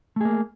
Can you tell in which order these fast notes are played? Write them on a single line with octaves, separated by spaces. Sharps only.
A3 G#4 A#3